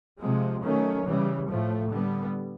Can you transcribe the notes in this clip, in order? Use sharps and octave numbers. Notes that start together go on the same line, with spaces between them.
C3 F3 G#3
D#3 F#3 A3 C#4
C#3 E3 G3
A2 F3 A3
D3 G3 B3